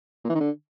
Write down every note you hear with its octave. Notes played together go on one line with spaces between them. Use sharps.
A#2
E3
D#3
D3